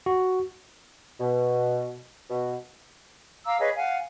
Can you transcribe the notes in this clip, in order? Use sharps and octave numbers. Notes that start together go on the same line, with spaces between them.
F#4
B2
B2
F5 A#5 D6 E6
G#4 B4 C#5 D#5
F5 F#5 G#5